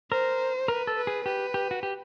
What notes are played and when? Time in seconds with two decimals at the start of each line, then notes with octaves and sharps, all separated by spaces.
0.11 A#4 C5
0.68 A#4 B4
0.87 A4
0.97 B4
1.07 G#4
1.26 G4 B4
1.54 G4
1.71 F#4
1.83 G4